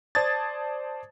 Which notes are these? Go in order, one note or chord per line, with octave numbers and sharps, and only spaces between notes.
C5 D5 A5 D#6 G#6 A6